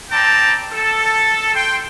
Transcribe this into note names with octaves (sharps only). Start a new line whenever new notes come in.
C4 D5 G5 A5 A#5
A4
G5 C6